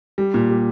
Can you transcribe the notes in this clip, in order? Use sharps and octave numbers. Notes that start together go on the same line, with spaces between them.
G3
A#2
G3